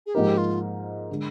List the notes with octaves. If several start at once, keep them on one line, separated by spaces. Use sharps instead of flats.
G#4
G#2 F3 A#3 D#4 G4 A#4
F4
D3 G#3